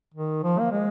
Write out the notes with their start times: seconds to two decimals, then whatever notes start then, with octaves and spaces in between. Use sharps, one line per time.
0.14 D#3
0.43 F3
0.59 A#3
0.71 G#3